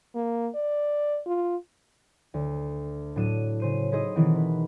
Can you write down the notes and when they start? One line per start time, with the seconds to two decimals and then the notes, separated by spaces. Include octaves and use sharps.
0.15 A#3
0.55 D5
1.26 F4
2.34 D2
3.16 A2 F#3 D4 F#6 D#7 E7
3.60 C#3 C5 D#7
3.91 D#4 E4 G#4 C5 D#5
4.16 B2 D#3 E3 C4
4.36 B4